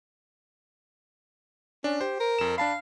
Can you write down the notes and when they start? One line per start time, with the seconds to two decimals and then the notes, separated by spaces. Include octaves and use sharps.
1.84 C#4 D4
2.01 G4 C5
2.20 A#4
2.39 F2 E7
2.58 D4 F5 A5 B5